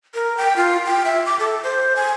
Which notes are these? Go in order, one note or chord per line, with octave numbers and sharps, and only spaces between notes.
A#4
G5
F4
G5
E5
D6
A4
C5
G#5